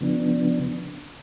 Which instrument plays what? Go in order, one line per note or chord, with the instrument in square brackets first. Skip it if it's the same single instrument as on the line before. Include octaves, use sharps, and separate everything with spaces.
[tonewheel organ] C#3 F3 B3 D4